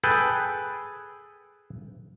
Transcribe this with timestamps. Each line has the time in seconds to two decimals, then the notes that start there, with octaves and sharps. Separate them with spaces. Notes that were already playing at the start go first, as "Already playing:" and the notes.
0.04 G#4 A4 B4 G5